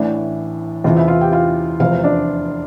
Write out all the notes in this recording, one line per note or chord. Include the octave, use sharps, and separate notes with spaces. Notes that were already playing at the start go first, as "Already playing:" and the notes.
Already playing: A1 A2 E3 D4 D5
E2 C3 E3 F4 F5
E4 E5
F4 F5
G4 G5
F4 F5
F1 E2 C3 F4 F5
D4 D5